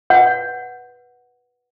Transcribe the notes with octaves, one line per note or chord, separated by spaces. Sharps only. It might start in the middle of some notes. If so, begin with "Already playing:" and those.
B4 C#5 F#5